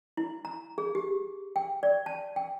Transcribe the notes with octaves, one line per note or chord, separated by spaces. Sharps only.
E4
A#5
G#4
G4
G5
D5
A5
G5